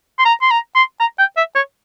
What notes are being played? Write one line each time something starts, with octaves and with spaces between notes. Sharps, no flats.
C6
A#5
C6
A#5
C6
A#5
G5
E5
C#5